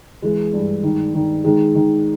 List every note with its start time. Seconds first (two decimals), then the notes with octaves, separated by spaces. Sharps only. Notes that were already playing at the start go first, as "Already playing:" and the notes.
0.22 E3 G#3
0.53 G2
0.83 D#3
1.15 D#3
1.44 D#3 G#3
1.75 D#3